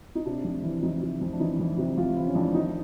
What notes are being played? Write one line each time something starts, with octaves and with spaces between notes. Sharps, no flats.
D#4
C3 D4
F2
E3
F2 D#4
C3
F2
D4
E3 D#4
F2
C3
F2 F4
E3 E4
C#4
F2 D4
D#3 D#4